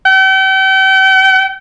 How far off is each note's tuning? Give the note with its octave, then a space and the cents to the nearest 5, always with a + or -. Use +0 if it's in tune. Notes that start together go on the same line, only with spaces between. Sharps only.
G5 -40